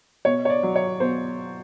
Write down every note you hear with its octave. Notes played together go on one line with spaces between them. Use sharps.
B2 C#5
C#5
D5
F#3
C#5
B2 C5